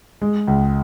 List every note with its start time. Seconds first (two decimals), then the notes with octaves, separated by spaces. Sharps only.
0.21 G#3
0.48 C#2